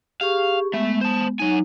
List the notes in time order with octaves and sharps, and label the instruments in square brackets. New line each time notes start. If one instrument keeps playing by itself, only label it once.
[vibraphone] G4 G#4 C#6 [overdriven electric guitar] F5
[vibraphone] G#3 B3 [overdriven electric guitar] A3 E5
[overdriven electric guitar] C5 A5
[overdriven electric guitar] F#3 G#5 [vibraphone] D#4